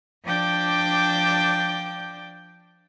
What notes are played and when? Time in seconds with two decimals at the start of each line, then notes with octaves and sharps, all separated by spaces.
0.25 F3 D4 D5 G5 D6 G6